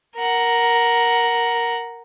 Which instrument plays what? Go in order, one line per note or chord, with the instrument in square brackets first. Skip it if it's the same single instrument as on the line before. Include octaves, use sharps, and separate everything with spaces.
[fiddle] A#4 F#5